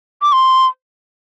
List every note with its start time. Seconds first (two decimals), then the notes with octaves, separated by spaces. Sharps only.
0.22 D6
0.32 C6